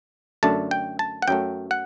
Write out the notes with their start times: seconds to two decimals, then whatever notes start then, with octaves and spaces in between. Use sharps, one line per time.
0.43 F#2 D3 A3 D4 A5
0.71 G5
0.99 A5
1.22 F#5
1.28 F#2 F#3 A3 G5
1.71 F#5